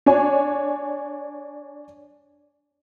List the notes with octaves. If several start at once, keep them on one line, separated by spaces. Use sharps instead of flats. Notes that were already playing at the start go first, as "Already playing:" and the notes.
D4 C#5 G#5